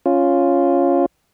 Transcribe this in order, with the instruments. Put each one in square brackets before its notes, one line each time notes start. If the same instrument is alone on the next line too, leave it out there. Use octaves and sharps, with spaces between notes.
[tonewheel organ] C#4 F4